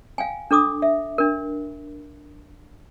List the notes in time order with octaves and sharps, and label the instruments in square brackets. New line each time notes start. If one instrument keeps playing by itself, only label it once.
[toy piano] F5 G5 G#5
D4 A4 D6 D#6
E5
D4 A#4